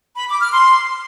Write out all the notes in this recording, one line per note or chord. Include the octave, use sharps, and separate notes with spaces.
B5
D6
F6
C6